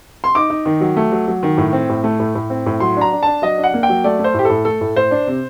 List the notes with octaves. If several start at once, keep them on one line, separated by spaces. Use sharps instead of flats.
C6
D#4 D6
D#4
D#3
F#3
A3
F#3
F#3
D#3
A2
C4
A2
A3
A2
A2
C4
A2
F#3 C6
D4 A#5
D4
D4 A5
F#3 D#5
D4
F#5
A#3
G5
F#3
A3 D5
A3
C5
A2 G4
A2 A4
A3 A4
A2
A2 C5
D4
C3